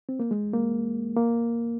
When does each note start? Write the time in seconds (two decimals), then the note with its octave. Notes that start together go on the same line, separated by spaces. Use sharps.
0.09 C4
0.20 A#3
0.31 G#3
0.53 A#3
1.16 A#3